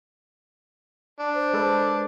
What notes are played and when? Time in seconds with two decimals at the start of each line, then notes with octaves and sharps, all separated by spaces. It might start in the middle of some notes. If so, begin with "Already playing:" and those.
1.20 D4
1.35 C5
1.53 G#3 A4 B4 C5